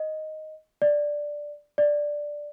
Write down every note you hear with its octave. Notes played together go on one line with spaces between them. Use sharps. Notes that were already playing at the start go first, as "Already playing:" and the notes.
Already playing: D#5
D5
D5